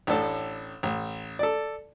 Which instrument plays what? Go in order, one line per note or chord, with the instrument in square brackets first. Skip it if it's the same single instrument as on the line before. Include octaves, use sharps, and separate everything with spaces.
[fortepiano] A1 A2 D4 A4
A1
A4 D5